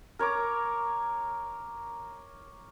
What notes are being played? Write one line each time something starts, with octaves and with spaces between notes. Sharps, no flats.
A#4 C#5 A#5 D6